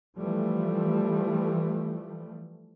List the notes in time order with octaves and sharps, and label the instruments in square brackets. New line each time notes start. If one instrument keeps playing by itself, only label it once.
[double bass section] E3 F3 G3 A3